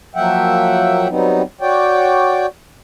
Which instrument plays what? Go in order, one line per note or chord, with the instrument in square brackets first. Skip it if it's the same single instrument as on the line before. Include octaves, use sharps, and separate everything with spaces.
[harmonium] F3 F#3 A#3 E5 F#5 G5
F#3 G3 B3 C4 D#4
F#4 C#5 D5 G5